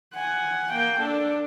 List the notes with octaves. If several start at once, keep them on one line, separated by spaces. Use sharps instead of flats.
F#5 G#5
A#3 G5
D4 A4